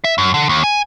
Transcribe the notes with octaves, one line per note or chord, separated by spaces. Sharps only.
E5
F#2
D3
D#2
G#5